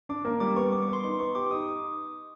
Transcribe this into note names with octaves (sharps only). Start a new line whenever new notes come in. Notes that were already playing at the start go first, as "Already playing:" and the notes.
D4 D6
A#3
G3 D6
B3 C#6
B3 D6
C#6
B3 C6
D#4 C6
B3 C#6
G4 D6
D6
D#4 D#6